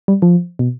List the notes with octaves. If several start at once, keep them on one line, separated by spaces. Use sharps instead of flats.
G3
F3
B2